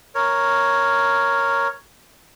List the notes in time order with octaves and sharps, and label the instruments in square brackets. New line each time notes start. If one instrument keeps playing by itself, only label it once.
[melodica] A#4 C#5